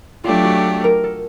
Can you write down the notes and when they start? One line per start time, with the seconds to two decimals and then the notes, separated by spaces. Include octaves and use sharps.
0.24 F#3 A3 D4 F4 G4
0.45 F#4
0.84 A#4
1.04 A4